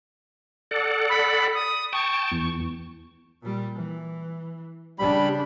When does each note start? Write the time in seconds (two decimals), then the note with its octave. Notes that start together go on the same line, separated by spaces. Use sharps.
0.71 A4 D5 F#5
1.09 B5
1.54 D#6
1.93 G5 A5 C#6
2.31 E2
3.42 A#2 G3
3.76 E3
4.99 C#3 G3 D4 B5